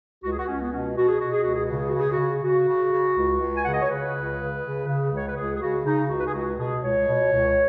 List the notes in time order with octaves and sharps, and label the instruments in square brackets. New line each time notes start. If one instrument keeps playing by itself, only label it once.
[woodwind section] C#2 F#4
G#4
F#4
C#2 C#4
B3
B2 C#4
B2 F#4
G#4
B2 F#4
G#4
C#2 F#4
G#4
C#3 F#4
G#4
F#4
C#3
G#4
F#4
C#3
C#3 F#4
C#3
C#3
C#2
C#2
G#5
C#3 F#5
D#5
C#5
C#3 B4
C#2
C#3
C#3
C#3
C#2 C#5
B4
C#2 G#4
G#4
C#3 F#4
C#3 D#4
C#2 F#4
B4
G#4
C#2 F#4
B2 G#4
C#2 C#5
B2
C#2